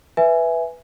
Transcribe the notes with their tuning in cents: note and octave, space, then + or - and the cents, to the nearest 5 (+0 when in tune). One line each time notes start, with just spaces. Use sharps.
B4 +0 E5 +0 G#5 +0